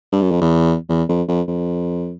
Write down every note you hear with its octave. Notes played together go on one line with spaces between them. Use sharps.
G2
F#2
F2
E2
E2
F2
F2
F2